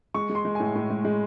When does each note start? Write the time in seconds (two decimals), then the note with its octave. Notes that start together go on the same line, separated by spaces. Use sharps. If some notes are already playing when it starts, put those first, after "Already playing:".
0.14 G#3 C#6
0.30 G#3
0.35 C6
0.45 G#3
0.55 A2 G#5
0.75 A2
0.90 G#3
1.05 G#3